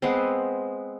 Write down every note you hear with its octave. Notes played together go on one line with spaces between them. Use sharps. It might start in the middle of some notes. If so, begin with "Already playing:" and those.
G#3 B3 C4